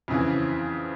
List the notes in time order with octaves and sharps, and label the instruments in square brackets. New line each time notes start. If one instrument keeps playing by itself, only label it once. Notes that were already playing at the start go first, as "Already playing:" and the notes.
[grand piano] F2 C#3 E3